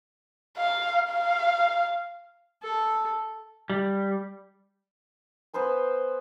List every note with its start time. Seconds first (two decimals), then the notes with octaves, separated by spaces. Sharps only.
0.58 F5
1.10 F5
2.63 A4
3.70 G3
5.53 B3 B4 C5 G#5